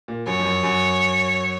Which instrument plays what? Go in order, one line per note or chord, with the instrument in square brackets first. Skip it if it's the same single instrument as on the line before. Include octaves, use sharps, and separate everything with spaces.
[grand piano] A#2
[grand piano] F#2 [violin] C#5
[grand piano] F2
F#2
F#2